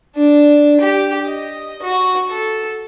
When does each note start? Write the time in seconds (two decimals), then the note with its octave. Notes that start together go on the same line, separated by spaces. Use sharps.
0.16 D4
0.80 G4
1.26 D#5
1.82 F#4
2.29 A4